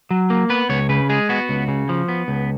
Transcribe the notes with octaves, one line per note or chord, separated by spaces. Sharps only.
F#3
A#3
B3 B4
C#2 C#5
C#3 B4
G#3 G#4
B3 F#4
C#2
C#3
F3
B3
C#2